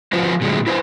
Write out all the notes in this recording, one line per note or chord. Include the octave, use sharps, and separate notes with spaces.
F3 F4 F#4 B4 C5
A#2 D3 F#3 G#3 A3
E4 B4 C5 F#5 G#5